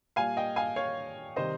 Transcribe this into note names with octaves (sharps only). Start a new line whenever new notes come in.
A#2 G3 F5 G#5
D#5 G5
F5 G#5
C#5 F5
C3 D#3 G3 C5 D#5